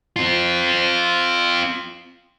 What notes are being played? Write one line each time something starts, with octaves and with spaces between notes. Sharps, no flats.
C4 F4